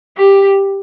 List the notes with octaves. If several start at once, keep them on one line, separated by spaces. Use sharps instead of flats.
G4